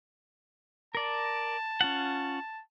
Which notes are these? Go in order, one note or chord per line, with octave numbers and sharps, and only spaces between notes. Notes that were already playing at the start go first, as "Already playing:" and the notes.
A#4 D5 A5
C#4 F4 F#5